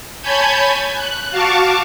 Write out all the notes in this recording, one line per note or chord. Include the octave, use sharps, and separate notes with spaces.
C#5 G#5 A5 B5 G6 G#6
F#6
F#4 F5 A5 C#6 D6